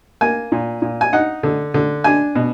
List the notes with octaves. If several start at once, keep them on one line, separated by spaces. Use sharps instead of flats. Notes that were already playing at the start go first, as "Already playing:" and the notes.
A#3 G#5
A#2
A#2
G#5
D#4 F#5
D3
D3
D4 G#5
B2